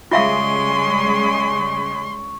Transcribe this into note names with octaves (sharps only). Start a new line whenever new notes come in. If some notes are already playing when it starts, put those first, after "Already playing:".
C#3 G3 G#3 F4 E5 F5 C6 C#6